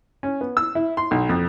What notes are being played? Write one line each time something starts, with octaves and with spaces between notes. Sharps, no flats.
C#4
B3
E6
E4
C6
B1
F2